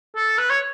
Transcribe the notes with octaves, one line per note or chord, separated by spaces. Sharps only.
A4
B4
C#5